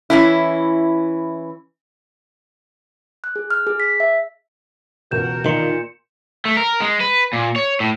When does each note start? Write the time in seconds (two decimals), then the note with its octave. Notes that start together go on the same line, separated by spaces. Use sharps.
0.10 E3 C#4 E4
3.24 F#6
3.36 G#4
3.51 F6
3.67 G#4
3.80 B6
4.00 E5
5.11 E1 C#2 F#4 A#4 G6 E7
5.46 A#2 D#3 C6 C#7 E7
6.45 A3
6.57 A#4
6.80 G#3
7.00 B4
7.33 A#2
7.56 C#5
7.80 A2